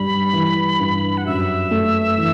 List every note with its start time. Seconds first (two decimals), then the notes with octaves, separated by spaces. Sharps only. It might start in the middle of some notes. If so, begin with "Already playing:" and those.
Already playing: G2 G3 B5
0.33 E3
0.80 G2
1.17 F#5
1.26 F#2 E5
1.71 A3
2.18 E3